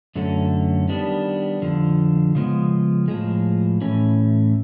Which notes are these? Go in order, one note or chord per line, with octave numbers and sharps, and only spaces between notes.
F#2 D3 F#3 A3 C#4
D#3 G3 B3 D4
F2 D3 F3
C#3 F3 G#3 B3
A2 F3 G#3
A2 E3 A3 C#4